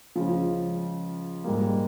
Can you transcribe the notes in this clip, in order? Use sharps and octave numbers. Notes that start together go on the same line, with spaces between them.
C#2 C#3 F3
G#2 G3 A#3